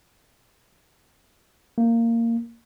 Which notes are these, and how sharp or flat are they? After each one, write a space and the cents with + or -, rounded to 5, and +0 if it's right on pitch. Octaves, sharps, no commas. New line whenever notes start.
A#3 -15